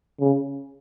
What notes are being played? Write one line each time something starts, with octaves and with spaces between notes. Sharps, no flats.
C#3